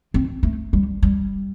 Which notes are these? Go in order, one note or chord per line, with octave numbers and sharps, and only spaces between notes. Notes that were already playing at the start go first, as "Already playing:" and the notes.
C4
A3
G3
G3